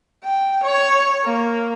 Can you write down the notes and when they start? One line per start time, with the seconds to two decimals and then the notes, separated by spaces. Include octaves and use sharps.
0.24 G5
0.64 C#5
1.25 A#3